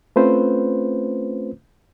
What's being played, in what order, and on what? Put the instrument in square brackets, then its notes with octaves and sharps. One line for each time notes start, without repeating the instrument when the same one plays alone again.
[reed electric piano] A3 C4 C#4 F4 B4 C5